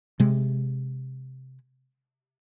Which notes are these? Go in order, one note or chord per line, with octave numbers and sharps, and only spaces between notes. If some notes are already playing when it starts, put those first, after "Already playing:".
C3 G#3